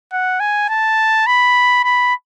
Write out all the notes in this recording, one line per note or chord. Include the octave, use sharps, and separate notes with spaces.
F#5
G#5
A5
B5
B5